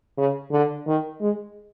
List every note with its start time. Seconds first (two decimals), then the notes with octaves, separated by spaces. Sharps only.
0.17 C#3
0.52 D3
0.87 D#3
1.21 G#3